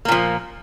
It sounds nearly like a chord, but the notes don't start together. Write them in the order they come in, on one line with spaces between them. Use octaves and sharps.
A#3 A#2 F3